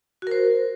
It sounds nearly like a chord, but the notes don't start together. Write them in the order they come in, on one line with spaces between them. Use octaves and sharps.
F#4 A#4 C5